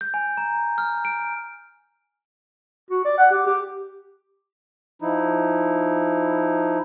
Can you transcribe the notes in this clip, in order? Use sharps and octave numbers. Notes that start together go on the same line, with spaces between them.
G6
G#5
A#5
F6
D7
F#4
D5
F#5
G4
G4
F3 D#4 E4